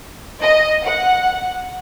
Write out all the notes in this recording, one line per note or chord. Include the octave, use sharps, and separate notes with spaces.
D#5
F#5